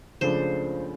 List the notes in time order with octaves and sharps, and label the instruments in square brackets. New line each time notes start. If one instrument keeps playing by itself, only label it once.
[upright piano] C#2 C#3 F3 A3 D4 [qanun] C5